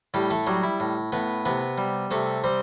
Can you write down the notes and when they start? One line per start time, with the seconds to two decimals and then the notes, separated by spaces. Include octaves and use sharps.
0.14 A2 G3 G4
0.31 A3 A4
0.47 F#3 G3 F#4
0.63 E4
0.80 A2
1.12 A2 B3 B4
1.45 C3 B3 B4
1.78 G3
2.11 C3 A3 A4
2.44 G3 C4 C5